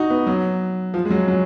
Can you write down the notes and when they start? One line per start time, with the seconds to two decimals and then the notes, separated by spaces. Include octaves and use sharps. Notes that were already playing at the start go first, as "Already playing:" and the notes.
Already playing: D#4 F#4
0.10 B3
0.27 F#3
0.94 F3
1.05 G#3
1.10 F#3
1.28 F#3